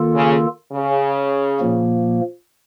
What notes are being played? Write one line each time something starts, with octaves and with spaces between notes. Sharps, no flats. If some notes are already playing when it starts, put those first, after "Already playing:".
Already playing: D#3 A#3 F4 A4
C#3
C#3
A#2 F3 A#3